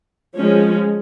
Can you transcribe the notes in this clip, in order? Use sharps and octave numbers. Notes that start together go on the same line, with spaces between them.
F3 G#3 C#4